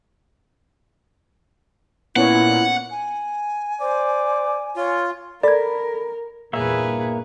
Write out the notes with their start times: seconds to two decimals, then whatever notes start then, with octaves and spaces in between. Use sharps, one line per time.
2.16 A#2 B3 C#4 E4 C#5 F#5
2.91 G#5
3.81 C5 D5
4.77 F4 C#5
5.43 A4 A#4 D5 B5 G#6
6.53 E2 G2 A#2 A#3 G#4 B4 C#5 E5